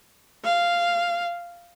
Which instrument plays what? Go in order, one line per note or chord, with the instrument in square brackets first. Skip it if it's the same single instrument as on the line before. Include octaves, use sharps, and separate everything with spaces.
[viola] F5